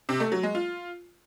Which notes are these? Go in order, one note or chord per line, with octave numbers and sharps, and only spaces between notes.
C3
A3
F#3
G#3
F4